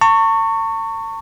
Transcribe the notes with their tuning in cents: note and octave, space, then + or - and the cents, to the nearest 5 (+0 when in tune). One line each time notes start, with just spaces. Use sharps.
A5 +45 C#6 +0